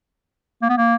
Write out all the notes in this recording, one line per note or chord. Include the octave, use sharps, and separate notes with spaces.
A#3
B3
A#3